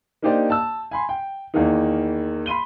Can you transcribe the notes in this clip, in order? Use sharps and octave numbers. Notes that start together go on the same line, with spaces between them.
A#3 D4 D#4 G4 C5 D5
A5 E6
G#5 B5 C6
G5
E2 D#3 E3 A#3 D#4
B5 C6 D#7 G7